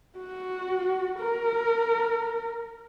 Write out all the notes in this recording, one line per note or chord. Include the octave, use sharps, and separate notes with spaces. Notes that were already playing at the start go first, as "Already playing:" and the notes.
F#4
A#4